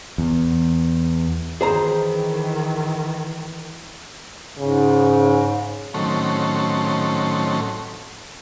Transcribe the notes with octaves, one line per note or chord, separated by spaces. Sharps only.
E2
D#3 E3 G#4 C5 A#5
G#2 C#3
A2 D#3 F#3 C4 C#4 A4